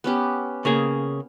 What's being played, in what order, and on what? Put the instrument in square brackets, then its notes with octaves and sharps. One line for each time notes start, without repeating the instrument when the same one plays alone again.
[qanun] B3 C#4 G4
[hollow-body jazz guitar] C#3 A#3 G#4